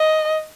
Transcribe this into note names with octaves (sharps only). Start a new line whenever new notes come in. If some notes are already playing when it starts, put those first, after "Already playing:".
Already playing: D#5